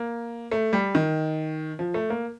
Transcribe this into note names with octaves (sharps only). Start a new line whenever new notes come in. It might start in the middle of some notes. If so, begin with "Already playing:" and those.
Already playing: A#3
A3
G3
D#3
F3
A3
A#3